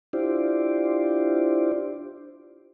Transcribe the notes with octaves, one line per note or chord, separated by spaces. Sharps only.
D4 E4 F4 G4 C5 D5